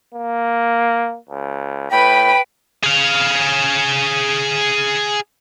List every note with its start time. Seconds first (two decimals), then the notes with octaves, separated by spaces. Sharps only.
0.15 A#3
1.29 C#2
1.91 A2 B4 G5 B5
2.84 G#4 F5